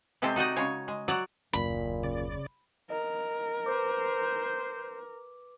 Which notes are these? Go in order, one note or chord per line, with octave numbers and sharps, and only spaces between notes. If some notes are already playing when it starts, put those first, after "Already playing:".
C3 G#3 C4 G4 A4
D#4 F#4 D5 D#5
C#3 G#3 C#5
G#3
F#3 D5 F#5
F#1 D#2 A#2 B5
C#3 D5
A#4 D#5
B4 C5 D6